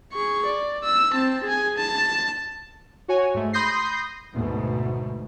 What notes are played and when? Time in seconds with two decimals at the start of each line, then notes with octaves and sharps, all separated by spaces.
0.14 G#4 C#6
0.46 D5
0.84 E6
1.12 C4 A5
1.43 G#4 G#5
1.78 A5
3.08 F#4 C#5 G#5
3.34 G#2 A3
3.53 B5 C6 D#6 G6 A#6 C7
4.33 D2 G#2 B2